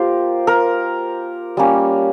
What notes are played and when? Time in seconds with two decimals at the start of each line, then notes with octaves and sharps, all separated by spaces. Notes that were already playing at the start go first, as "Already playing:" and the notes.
Already playing: A#3 F4 G4 A#4 C5
0.47 A#4
1.57 G3 A#3 C#4